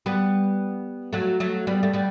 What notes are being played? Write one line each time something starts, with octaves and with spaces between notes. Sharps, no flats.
G3 B3
F#3 A3
F#3 A3
G3 B3
A3
G3 B3